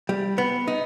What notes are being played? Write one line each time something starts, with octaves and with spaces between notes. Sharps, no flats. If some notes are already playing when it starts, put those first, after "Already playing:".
G3
B3
D#4